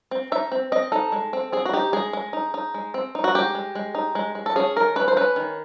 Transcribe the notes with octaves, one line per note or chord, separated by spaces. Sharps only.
C4
D#4 E5
C4
C4 D#5
D#4 A4
G#3
C4
C4 G#4
F#4
D#4 G4
G#3 G#4
G#3
D#4
D#4
G#3
C4
D#4
F#4
G#3 G4
G#3
G#3
D#4
G#3
G#3
A4
C#4 G#4
D#3 A#4
C#4 B4
C5
C#4 B4
D#3